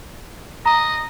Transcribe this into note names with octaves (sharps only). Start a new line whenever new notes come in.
D#5 A#5